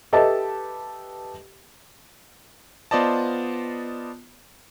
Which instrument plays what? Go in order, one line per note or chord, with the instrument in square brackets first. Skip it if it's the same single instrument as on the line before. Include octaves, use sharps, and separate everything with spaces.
[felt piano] G4 A4 B4 D#5 E5 A5
[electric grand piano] B3 F4 C5 D5 D#5 A5